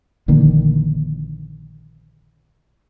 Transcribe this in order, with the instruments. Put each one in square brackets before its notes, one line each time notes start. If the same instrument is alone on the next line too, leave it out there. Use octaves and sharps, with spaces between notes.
[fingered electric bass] A#1 D3 D#3 A#3